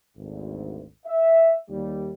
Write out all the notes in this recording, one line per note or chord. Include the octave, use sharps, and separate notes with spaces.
G#1 D2
E5
D#2 G3